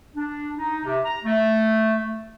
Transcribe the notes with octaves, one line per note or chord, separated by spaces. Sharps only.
D4
D#4
C3
A#5
A3